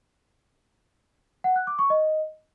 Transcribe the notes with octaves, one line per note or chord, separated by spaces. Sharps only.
F#5
F#6
D6
C#6
D#5